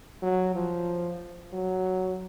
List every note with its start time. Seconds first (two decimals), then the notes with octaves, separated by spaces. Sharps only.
0.22 F#3
0.55 F3
1.53 F#3